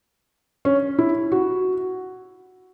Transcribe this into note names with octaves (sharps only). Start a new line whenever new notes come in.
C#4
E4
F#4